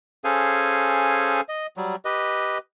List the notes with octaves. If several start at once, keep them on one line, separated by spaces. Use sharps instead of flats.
C#4 G#4 A4 C5 F5 G#5
D#5
F#3 G3
G4 B4 D#5